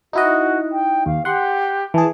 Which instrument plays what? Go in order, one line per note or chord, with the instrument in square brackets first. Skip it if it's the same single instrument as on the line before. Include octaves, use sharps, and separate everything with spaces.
[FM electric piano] D#4 E4 D#5 [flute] F#4
[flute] G5
[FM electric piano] D#2 [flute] F5
[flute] G4 [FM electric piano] F#5 C6
[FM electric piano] E3 G#4 [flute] A5